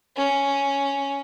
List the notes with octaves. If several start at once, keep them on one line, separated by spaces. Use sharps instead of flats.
C#4